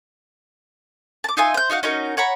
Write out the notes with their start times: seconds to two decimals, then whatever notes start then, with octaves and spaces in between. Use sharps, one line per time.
1.24 A5 D6
1.37 D#4 F4 E5 G#5
1.54 C5 G6
1.70 D#4 F#4 F5 F#5
1.83 C#4 D#4 F#4 A#4
2.17 C#5 F#5 A#5 B5